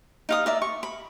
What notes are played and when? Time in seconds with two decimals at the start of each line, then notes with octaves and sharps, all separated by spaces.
0.29 D#4 F5 D#6
0.46 A#4 D5 E5
0.62 C#6
0.83 B5